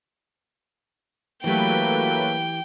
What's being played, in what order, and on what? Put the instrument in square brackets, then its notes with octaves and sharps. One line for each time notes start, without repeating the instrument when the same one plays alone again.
[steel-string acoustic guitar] E3 G4 [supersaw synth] F#3 A3 B4 [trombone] A#3 [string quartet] G5